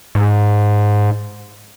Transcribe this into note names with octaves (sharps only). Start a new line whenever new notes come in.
G#2